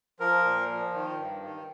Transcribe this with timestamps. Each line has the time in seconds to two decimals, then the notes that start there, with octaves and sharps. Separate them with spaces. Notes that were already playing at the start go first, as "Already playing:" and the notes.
0.20 F3 A#4
0.45 A#2
0.69 F3
0.94 D#3
1.18 G2
1.43 D#3